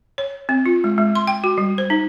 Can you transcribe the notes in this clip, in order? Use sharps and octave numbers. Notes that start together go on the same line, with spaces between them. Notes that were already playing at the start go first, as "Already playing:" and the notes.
C#5
C4
F4
G#3
G#3
C6
G5
F#4
G3
C5
D#4